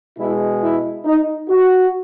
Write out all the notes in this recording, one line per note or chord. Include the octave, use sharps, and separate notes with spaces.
B2 G#3 E4
E4
D#4
F#4